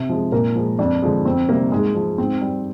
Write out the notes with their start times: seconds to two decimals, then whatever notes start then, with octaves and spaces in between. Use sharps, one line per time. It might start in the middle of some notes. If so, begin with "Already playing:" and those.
Already playing: C3
0.09 F3 G#3
0.32 A#2 A#3 A#4
0.55 F3 G#3
0.79 F2 D4 D5
1.02 D3 F3 G#3
1.25 F2 C4 C5
1.49 C3 G3 A#3 A#4
1.72 G#2 G#3 G#4
1.95 F3 G#3
2.18 G#2 C4
2.41 G3